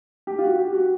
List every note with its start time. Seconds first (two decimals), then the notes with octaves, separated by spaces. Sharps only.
0.27 G4
0.39 F4
0.43 F#4
0.59 G4
0.73 F#4